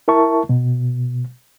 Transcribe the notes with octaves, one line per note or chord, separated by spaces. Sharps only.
E4 A#4 E5 A5 C#6
B2